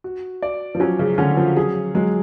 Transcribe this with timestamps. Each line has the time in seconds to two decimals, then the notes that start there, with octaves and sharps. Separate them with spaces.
0.04 F#4
0.42 D5
0.75 F3
0.80 F#3 C#4
0.99 C#3
1.18 D3 C#4
1.37 F3
1.56 F#3 G#4
1.95 F#3 G#3